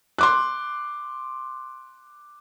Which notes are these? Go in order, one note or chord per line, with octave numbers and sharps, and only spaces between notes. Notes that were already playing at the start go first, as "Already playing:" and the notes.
C6 D6 F#6